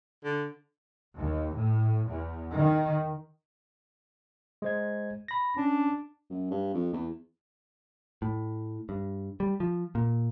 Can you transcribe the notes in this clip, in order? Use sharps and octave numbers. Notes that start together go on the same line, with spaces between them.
D3
D#2
A2
E2
D#3
G#3 C5 G#6
B5 A#6
C#4 D4
F#2
G2
F2
E2
A2
G2
G3
F3
A#2